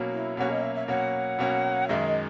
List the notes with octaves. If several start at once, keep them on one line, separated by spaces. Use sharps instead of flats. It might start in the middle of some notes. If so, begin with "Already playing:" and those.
Already playing: B2 F#3 A#3 C#4
E4
B2 F#3 A#3 C#4 F#4
D#5
E5
E5
B2 F#3 A#3 C#4 F#5
B2 F#3 A#3 C#4
F#2 D#3 G#3 D#4 E5
D#5